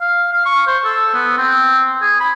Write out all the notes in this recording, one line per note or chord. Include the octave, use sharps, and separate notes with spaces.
F5
F5
C#6
C5
A4
B3
C4
G#4
B5